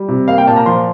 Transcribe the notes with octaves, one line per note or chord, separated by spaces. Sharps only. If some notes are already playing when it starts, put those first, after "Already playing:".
Already playing: G3
C3
A#3 F5
G5
A#2 A5
A#5
F3 C6